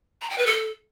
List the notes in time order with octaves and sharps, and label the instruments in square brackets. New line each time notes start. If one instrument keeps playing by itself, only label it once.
[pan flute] A#5
G5
B4
A4